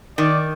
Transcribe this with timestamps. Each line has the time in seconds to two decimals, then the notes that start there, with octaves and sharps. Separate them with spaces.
0.18 D#3 D5